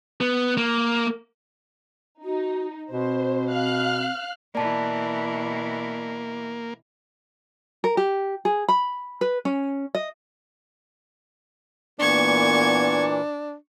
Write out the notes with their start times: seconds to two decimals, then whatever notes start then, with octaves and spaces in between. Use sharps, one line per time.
0.21 B3
0.57 A#3
2.24 D#4 F#4
2.91 B2 C4 C5
3.51 F5 F6 F#6
4.55 B2 E3 A#3 D5 A5
7.84 A#4
7.97 G4
8.45 G#4
8.68 B5
9.21 B4
9.45 C#4
9.95 D#5
11.99 A#2 E3 A#3 B3 D4 C#6 G#6